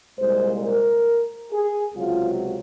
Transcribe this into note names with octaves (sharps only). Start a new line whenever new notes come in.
C2 A#2 G#3 C5
A#4
G#4
C#2 C3 F#3 F4